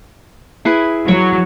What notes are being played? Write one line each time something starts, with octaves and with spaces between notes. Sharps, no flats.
E4 G#4 B4
F#3 C#5